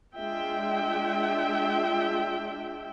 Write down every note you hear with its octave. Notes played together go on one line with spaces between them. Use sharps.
G#3 D4 F4 E5 G5